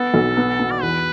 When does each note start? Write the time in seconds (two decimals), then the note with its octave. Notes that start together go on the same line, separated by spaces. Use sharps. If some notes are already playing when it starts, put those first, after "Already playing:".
Already playing: B3 A4
0.14 B1
0.37 B3
0.60 B3
0.71 D5
0.82 E2 B4